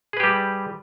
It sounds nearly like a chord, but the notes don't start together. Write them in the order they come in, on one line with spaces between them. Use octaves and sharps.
G#4 B4 G4 G3